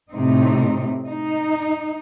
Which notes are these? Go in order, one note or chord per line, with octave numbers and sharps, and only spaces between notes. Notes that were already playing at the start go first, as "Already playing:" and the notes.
A2 C3 C4 D#4
D#4